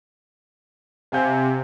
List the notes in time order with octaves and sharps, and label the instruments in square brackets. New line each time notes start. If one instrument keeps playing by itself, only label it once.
[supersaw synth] C3 [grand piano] F5 G#5 G6